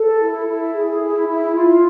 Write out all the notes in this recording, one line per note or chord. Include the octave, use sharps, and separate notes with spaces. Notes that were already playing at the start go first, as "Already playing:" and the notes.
Already playing: A4
E4
E4
G#4
E4
E4
F4